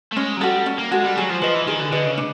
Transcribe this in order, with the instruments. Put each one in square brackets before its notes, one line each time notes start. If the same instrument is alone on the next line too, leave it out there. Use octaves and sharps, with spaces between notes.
[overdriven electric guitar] A3
[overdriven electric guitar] G#3 [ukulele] C#4
[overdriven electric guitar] F#3
[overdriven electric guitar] G3 [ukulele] F#4 A4
[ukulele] C#4
[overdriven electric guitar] A#3
[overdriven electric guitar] G#3 [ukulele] F#4 A4
[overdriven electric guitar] G3
[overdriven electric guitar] F#3 [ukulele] G#4
[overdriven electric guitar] F3
[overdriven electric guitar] F3 [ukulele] B4 D#5
[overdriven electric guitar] E3
[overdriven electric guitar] D#3 [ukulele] G#4
[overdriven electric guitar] D3
[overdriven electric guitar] D3 [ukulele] B4 D#5
[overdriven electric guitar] C#3
[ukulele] D4